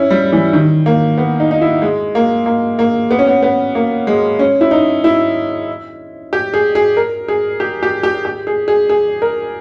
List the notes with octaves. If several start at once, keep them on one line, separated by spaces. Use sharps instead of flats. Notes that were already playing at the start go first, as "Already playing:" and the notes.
Already playing: C#4 E4
G3
E3
D#3
A#3
B3
D#4
D#4
E4
G#3
A#3
A#3
A#3
B3
C#4
B3
B3
A#3
G#3
C#4
E4
D#4
E4
G4
G#4
G#4
A#4
G#4
G4
G4
G4
G4
G#4
G#4
G#4
A#4